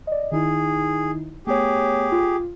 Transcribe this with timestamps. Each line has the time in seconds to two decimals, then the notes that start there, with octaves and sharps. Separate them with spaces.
0.07 D5 D#5
0.32 D#3 D#4 E4 G#4
1.47 A3 B3 G4 G#4 C#5
2.12 F4